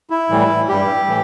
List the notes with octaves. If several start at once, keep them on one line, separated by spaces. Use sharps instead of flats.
E4
A2 E3 G3
G2 G3 G4
A2 E3